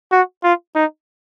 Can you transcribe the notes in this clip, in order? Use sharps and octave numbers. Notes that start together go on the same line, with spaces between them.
F#4
F4
D#4